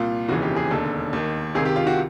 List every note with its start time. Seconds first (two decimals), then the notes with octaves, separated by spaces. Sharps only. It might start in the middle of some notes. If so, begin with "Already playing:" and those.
Already playing: C2 A#2 F4
0.28 F1 D#2 C#3 E3 F#4
0.43 G4
0.56 G#4
0.71 E1 D#2 D3 A4
1.13 D#2 D#3
1.55 C#2 C3 D#3 G#4
1.65 G4
1.76 F4
1.87 F#4